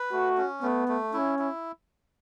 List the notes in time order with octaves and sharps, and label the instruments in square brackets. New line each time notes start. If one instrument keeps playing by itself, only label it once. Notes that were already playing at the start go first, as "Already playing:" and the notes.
Already playing: [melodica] B4
[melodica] A3 [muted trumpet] F#4
[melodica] C#4
[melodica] A3 [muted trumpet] B3
[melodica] A3
[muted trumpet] C#4 [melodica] E4
[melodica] E4